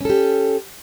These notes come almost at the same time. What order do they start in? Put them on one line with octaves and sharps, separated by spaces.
C#4 A4 G4